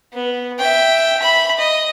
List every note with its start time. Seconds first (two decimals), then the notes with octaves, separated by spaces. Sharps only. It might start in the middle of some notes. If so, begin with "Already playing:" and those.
0.13 B3
0.59 E5 G5
1.20 E5 B5
1.57 D#5